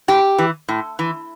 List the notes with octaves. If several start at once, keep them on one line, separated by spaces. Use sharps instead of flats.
A2 G4
E3
A2
E3